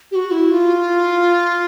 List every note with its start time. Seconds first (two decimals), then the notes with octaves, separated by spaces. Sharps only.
0.11 G4
0.15 F#4
0.31 E4
0.51 F4